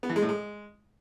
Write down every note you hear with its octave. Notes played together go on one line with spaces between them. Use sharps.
B3
E3
G#3
A2
G#3